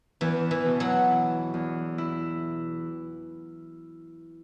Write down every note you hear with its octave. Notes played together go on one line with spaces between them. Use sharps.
E2 E3
E3
B2
F#3
E4
E2
E4